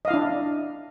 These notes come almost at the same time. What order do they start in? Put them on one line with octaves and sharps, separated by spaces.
D#5 F5 E4 D4